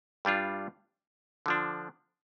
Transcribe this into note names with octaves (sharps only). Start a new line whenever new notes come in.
G2 G3 D4 F4
D3 F3 D4